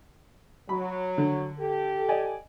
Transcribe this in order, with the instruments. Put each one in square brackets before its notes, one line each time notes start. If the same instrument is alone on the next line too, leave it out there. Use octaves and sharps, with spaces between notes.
[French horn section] F#3 [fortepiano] B5
[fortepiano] D3
[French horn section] G4 A4
[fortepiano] D5 D#5 G#5